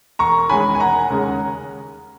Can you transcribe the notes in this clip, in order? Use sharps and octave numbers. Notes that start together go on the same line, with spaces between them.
E1 A#5 C#6
E2 D#3 G#3 C#4 G#5 B5
G#5
E1 F#5 A#5
D#2 C#3 G#3 C#4